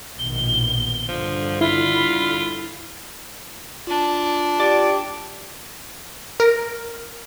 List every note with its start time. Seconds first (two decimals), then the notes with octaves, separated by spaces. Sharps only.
0.19 A#1 B2 D#3 G7
1.09 G2 D3 F3
1.61 E4 F4 B5
3.87 D4 F4
4.59 G4 D5
6.40 A#4